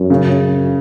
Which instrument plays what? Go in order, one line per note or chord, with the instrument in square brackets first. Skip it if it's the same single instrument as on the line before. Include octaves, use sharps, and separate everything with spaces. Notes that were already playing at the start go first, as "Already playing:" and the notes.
Already playing: [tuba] F#2
[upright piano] C#3